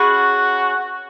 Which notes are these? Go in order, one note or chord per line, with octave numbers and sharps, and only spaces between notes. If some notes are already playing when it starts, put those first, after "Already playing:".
Already playing: C#4 F#4 G#4 B4